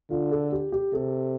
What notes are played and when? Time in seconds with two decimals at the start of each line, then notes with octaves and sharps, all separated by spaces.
0.10 D3 F4
0.31 A4
0.52 G4
0.72 G4
0.93 C3 A4